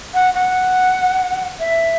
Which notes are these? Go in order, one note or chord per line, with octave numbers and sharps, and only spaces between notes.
F#5
F#5
E5